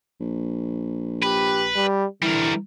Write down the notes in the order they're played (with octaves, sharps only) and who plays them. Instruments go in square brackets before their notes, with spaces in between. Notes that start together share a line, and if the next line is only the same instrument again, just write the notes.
[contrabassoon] A#1
[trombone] G4 [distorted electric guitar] B4
[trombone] G3
[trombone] D3 [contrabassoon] E3 [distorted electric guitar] G3 A#4